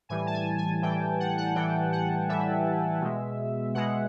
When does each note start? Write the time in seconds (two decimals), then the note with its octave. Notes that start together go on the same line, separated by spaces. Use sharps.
0.09 A2 E3 G3 G#5
0.27 A5
0.34 G#5
0.58 G#5
0.82 A2 E3 G3 G5
1.20 F#5
1.38 F#5
1.55 A2 E3 G3 G5
1.93 F#5
2.29 A2 E3 G3 E5
3.01 B2 G#3
3.75 B2 G#3 F#5